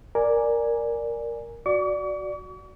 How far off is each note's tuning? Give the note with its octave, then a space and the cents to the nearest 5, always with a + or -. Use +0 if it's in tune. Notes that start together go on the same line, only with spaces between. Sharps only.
A#4 +0 D5 +0 G#5 +0
F#4 +0 D5 +0 C#6 +45